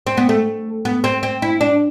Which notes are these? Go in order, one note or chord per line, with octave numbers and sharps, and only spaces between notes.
C4
B3
A3
B3
C4
C4
E4
D4